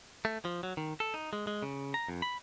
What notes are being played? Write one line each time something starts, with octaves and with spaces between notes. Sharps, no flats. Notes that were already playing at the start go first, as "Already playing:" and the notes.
A3
F3
F#3
D#3
A4
D#4
G#3
G#3
C#3
A#5
F2
B5